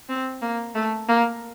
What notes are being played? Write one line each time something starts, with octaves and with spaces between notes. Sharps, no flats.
C4
A#3
A3
A#3